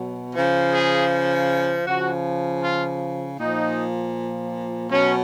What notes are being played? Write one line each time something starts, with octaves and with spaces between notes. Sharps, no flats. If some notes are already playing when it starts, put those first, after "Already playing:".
Already playing: B2 F#3
C#3 F3
G#4
C#3 F3 F#4
F4
A#2 F3 D#4
B2 F#3 C#4